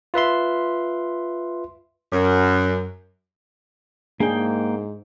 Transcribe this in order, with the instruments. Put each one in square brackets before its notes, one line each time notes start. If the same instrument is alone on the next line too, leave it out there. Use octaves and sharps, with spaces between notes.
[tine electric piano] F4 B4 E5 C6
[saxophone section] F#2
[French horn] G#2 [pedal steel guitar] A#3 G5 [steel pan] D4 G#4